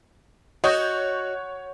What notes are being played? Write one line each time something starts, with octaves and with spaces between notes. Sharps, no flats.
F#4 C#5 D#5 G6